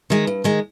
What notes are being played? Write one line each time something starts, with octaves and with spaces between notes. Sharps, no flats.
D#3 G#3
G2
D#3 G#3